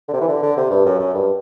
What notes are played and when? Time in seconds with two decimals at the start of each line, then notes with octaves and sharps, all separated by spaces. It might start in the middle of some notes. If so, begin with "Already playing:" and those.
0.08 D3
0.13 C3
0.21 E3
0.28 D3
0.43 D3
0.57 C3
0.70 G2
0.86 F#2
1.00 F#2
1.15 G2